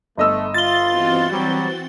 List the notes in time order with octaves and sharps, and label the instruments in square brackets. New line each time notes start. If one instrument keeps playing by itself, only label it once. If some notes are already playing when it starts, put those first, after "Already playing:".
[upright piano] G1 D#5 E6 [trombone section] A3
[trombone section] F4 [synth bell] A6 G7
[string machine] E3 C4 F#4
[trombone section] F#3 G3